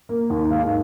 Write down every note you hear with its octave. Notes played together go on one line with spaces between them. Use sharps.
A#3
D#2
G#2 F5